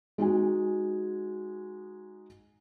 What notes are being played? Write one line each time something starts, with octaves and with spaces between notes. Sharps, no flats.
G#3 D#4 F#4 G#5